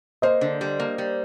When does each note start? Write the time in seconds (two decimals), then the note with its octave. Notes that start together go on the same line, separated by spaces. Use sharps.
0.22 A#3 C5 D#5
0.41 D3
0.61 G3
0.80 A#3
0.98 G3